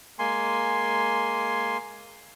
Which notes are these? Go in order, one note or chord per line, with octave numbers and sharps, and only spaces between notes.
G#3 A#3 G#5 C6